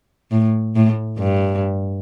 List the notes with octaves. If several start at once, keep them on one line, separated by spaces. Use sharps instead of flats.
A2
A2
G2